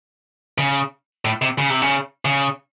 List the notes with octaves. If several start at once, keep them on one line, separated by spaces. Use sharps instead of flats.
C#3
A2
C3
C#3
C3
C#3
C#3